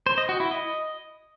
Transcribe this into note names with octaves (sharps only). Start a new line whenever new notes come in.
C5
D#5
F#4
E4
D#5